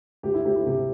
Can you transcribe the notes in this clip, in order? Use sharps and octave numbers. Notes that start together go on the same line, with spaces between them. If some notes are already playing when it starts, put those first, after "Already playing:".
D2 G4
E4
D2 G4
E4
C3 G4